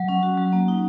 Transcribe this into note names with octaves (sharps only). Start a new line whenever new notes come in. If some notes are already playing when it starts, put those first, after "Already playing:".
Already playing: F#3
C#4
F#4
F#3
A#3
D#4